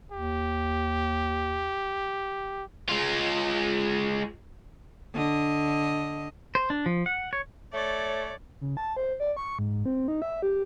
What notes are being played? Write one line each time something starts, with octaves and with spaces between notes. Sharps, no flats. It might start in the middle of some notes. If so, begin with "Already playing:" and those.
D#2 G4
G#3 F4
D3 D#5
C5
D4
F3
F#5
C#5
A3 C#5 D5
C#3
A5
C5
D5
C#6
G#2
C4
D#4
E5
G4